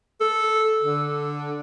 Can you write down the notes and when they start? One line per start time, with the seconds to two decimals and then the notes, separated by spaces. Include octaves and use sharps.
0.21 A4
0.82 D3